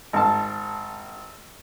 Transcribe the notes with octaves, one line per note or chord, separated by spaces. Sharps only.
G#1 A5